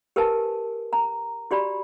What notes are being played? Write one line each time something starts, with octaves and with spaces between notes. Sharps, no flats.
G4 A#4 B4 G#5 A5
A#5
F#4 G4 D5 B5